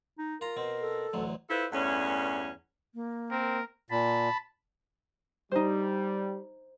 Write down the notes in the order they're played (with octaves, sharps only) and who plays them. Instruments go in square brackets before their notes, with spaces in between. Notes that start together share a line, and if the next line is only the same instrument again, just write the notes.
[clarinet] D#4
[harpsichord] F4 A#5 [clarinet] A#4
[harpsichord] B2 C4
[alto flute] A4
[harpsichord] A1 D2 F#3
[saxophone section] E4 F4 A4 B4 C5
E2 G2 A3 C#4
[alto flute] A#3
[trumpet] C4 [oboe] A#4
[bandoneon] A#2 [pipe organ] A5 B5
[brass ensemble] G3 [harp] D#4 C5